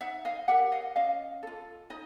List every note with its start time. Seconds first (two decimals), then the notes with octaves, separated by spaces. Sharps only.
0.01 D#4 E5 F#5
0.25 D#5 F5
0.48 G4 A#4 E5 F#5
0.72 D#5 F5
0.96 C#4 D#5 F5
1.43 F4 A4
1.90 D#4 D#5